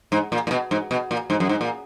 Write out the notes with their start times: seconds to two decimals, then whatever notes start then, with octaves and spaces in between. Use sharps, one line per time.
0.12 G#2
0.32 A#2
0.47 A#2
0.51 B2
0.71 G#2
0.91 B2
1.11 A#2
1.30 G#2
1.40 F#2
1.49 G#2
1.61 A#2